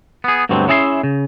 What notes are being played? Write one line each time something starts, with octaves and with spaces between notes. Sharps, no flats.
B3 G#4
D2 G2 B2 F#3 C4
C#4 E4 G#4 E5 A5 C6
C#3